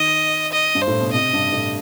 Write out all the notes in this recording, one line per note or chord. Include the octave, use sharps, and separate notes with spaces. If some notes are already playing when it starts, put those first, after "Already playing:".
Already playing: D#3 D#5
D#5
G2
C5
A2
B2
C3 D#5
G2
A2